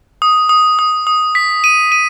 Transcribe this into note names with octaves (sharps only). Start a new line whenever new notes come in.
D#6
D#6
D#6
D#6
B6
D#7
D#7